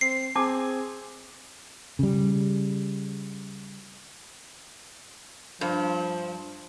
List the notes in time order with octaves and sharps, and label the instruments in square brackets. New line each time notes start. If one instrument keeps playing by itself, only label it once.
[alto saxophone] C4 [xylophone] C7
[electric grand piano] C4 G#4 [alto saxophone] G#5 [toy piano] A5 D6
[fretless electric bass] C#3 G3
[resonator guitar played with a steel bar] G2 [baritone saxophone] F3